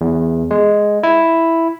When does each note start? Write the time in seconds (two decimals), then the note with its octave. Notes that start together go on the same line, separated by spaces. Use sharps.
0.01 E2
0.51 G#3
1.03 E4